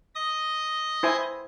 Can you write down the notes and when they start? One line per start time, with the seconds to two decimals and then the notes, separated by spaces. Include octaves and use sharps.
0.15 D#5 D#6
1.03 E4 C5 G#5